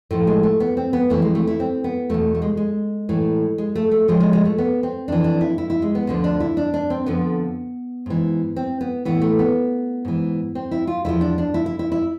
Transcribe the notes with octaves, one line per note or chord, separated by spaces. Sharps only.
A2 F3 A3
G#3
A3
B3
C4
B3
F2 E3 A3
G#3
A3
E4
C4
B3
E2 B2 A3
A3
G#3
G#3
A2 E3
G#3
A3
A3
A2 F3 G#3
G#3
G#3
A3
B3
C4
F2 E3 D4
D4
E4
E4
E4
G#3
B3
D2 D3 F3
D4
E4
D4
D4
C4
F2 D3 F3 B3
G#2 E3
C4
B3
A2 E3 B3
A3
B3
G#2 E3
C4
E4
F4
E2 D3 F3 E4
D4
D4
E4
E4
E4
E4